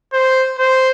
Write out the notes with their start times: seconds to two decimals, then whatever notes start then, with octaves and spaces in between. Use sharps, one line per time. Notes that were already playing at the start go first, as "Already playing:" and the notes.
0.13 C5
0.58 C5